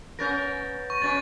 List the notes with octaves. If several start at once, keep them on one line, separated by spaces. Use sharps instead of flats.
B3 C#4 A#4 G6 A6 A#6
C#6
B2 C#4 A6